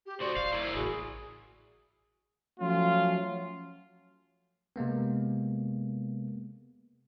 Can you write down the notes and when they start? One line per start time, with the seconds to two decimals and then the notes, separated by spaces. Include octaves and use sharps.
0.06 G4
0.20 D2 F#4 C5 D5
0.36 G1 F5
0.53 A#3 E4
0.75 A1 F#4 G#4
2.60 F3 F#3 A3 C#4 F4
4.76 C3 G#3 A#3 B3